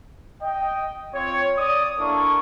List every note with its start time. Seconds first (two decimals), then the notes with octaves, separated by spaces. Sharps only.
0.42 D#5 G5
1.15 C4 F4 C#5
1.58 D5 D#6
2.00 A#3 D4 E4 A4 C#6